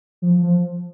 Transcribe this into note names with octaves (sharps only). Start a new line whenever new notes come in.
F3
F3